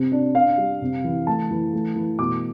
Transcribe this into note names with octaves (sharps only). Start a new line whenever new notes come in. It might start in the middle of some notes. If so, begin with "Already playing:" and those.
Already playing: C3 C4
D4
D4 F5
G3
C3
E3
A3 A5
E3
A3
E3
B2 D6